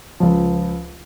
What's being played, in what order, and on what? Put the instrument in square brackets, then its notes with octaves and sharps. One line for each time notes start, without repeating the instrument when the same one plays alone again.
[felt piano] C#2 F3